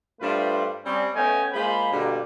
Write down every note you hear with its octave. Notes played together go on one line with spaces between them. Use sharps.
G2 A3 D4 F4 B4 C5
G3 C4 C#4
A3 B3 C#4 D#5 G5 G#5
G#3 A#3 F4 C5 B5
G2 B2 D3 G3 A#3 D4